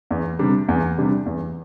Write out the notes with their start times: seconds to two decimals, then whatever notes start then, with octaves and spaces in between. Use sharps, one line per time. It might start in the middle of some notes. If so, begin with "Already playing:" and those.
0.11 E2
0.39 C3 G3 D4
0.68 E2
0.98 C3 G3 D4
1.26 E2